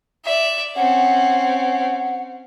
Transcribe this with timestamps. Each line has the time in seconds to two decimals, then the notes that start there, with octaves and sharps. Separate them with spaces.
0.24 D5 E5
0.76 C4 C#4 F#5